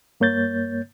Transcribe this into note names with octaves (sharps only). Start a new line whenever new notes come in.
G2 A#3 C#5 G6 A6